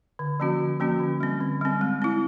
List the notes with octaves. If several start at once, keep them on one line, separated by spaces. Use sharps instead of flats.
D3
F3 A#3 C#4 F#4
D3
F3 A#3 C#4 F#4
D3
G3 C4
D3
G3 C4
G#3
C4 E4